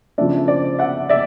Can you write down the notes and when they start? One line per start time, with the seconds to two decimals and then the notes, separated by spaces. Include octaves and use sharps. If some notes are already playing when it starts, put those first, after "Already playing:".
0.18 C#3 F3 A3 D4 D5 E5
0.48 C5 D5
0.79 E5 F#5
1.09 D5 E5